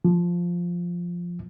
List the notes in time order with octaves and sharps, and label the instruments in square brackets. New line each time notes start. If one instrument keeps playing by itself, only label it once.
[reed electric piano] F3